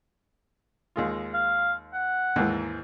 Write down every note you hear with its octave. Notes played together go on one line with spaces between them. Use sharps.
D#2 G#3 F4
F5
F#5
D#2 G#2 E3